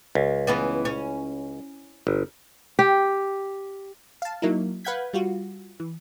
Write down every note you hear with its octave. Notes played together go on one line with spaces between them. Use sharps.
C#2
E3 B3 C#4
C#4
G1
G4
F5 A5
F#3 A#3 D#4 E4
B4 F5 F#5 G6 G#6 B6
G3 F4 F#4
E3